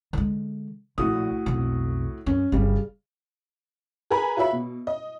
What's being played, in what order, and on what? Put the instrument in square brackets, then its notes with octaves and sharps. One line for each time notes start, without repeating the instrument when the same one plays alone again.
[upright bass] D3 G#3
[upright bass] A#1 [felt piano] A2 F#4 D#6
[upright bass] B1 F2
[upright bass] F#2 [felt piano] C#4
[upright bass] G1 F#3 [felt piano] C#3 G3
[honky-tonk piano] G#4 A#4 B4 G#5 A#5 B5
F4 F#4 C#5 E5 B5
B2
D#5